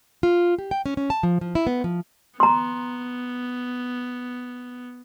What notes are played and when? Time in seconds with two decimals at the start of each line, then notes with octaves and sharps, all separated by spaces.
0.23 F4
0.59 G4
0.71 G5
0.86 C#4
0.97 C#4
1.10 A5
1.23 F3
1.41 F3
1.55 E4
1.67 B3
1.84 F3
2.40 B3 A#5 C6